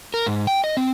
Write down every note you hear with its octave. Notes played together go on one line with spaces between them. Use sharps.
A#4
G#2
G5
D#5
C4